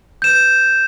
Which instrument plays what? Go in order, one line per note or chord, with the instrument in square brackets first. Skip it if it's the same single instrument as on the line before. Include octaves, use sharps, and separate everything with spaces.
[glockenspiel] G6 E7